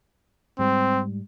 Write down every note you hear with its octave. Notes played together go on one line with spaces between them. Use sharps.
G#2 G3 C4